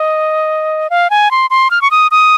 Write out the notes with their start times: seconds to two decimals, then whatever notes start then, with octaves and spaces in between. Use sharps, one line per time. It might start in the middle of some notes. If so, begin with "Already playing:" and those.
Already playing: D#5
0.90 F5
1.10 G#5
1.31 C6
1.50 C6
1.71 F6
1.82 C#6
1.91 D#6
2.11 D#6